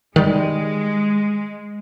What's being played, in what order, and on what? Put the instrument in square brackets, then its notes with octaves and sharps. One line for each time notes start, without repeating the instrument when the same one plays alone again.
[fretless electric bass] D#3 G3 [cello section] G#3